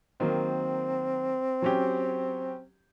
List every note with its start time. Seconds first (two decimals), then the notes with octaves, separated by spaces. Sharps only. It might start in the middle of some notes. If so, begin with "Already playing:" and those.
0.20 D#3 F#3 A#3 C4
1.62 F#3 C#4 G4